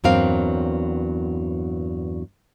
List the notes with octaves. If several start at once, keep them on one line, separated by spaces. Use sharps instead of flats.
E2 G2 F#3 A#3 C4 F5